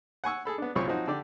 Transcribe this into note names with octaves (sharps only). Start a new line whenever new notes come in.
F#5 G#5 C#6 E6
G#4 A4 B5
B3 D4
C2 F#2 A#2 C4 C#5 C#6
F3 F#3 C4 D#4 F#4
D3 G4 D5